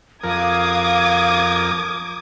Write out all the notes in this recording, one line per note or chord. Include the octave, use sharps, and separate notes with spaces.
F2 A#4 F5 D6 D#6 G#6